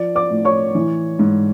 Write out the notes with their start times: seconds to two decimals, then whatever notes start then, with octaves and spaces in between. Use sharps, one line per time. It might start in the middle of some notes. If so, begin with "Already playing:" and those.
Already playing: F3 D5
0.15 D5 D6
0.30 A2
0.45 C#5 C#6
0.75 E3
1.19 G#2